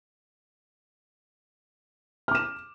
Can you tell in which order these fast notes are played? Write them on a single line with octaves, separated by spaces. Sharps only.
F6 D6 E7